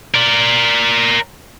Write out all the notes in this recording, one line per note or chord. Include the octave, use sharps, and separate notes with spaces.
A#4 D5